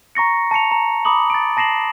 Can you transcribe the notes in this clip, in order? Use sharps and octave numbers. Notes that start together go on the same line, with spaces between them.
A#5 C#6 A#6 C#7
A5 A#6 C#7 F7
A#5
A#5 B5 D6 D#6 F#7
A6 D7
A5 A#6 C7 E7 F#7